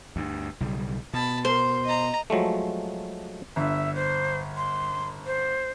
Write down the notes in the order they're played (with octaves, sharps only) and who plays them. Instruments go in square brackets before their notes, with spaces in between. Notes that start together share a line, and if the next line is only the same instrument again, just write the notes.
[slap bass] D2 G2
B1 C#3 G3
[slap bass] B2 [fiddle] A5 B5
[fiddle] A#4 C6 [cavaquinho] C5
[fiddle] D#5 A#5
[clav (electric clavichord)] F3 F#3 G#3 A3
[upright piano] G1 [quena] E5
[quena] C5
C6
C5